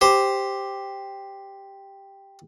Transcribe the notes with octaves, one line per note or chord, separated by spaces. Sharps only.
G4 C5